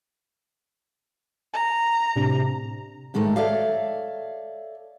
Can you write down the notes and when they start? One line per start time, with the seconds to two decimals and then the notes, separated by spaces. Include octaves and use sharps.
1.53 A#5
2.16 A2 C3 D4
3.14 G#2 D#3 G#3 A3
3.36 A4 C#5 D5 E5 F5